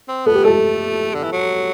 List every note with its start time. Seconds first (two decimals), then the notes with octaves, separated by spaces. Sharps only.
0.08 C4
0.26 B3 A4
0.35 G4
0.44 A3 A4
1.14 D3
1.23 E3
1.32 F#3